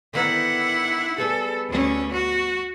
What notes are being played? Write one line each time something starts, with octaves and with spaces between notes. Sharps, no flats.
D3 D#3 B3 E4 F#5
G3 B3 G#4 A4
D2 C#4
F#4